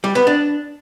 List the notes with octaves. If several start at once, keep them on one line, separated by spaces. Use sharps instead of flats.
G3
B3
D4